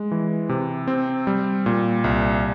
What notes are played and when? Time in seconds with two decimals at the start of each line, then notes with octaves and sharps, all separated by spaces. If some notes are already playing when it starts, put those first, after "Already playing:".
Already playing: G#3
0.11 E3
0.49 C3
0.88 C4
1.27 G3
1.66 A#2
2.04 C2